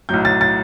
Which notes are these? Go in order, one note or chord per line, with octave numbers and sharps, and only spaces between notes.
B1 A2 F#3 G6
A6
A6